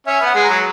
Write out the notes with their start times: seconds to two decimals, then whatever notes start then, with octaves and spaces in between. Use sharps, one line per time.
0.07 C#4 E5
0.21 B3 F#5
0.35 G#3
0.44 F#3 A#5